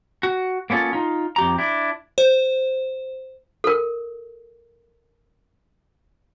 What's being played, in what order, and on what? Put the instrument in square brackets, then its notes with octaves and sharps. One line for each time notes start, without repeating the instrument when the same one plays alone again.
[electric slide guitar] F#4
A#3 B3 C#4 F4 A4
D#4 F4
F2 G4 A#5
D4 E4
[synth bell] C5
[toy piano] A4 A#4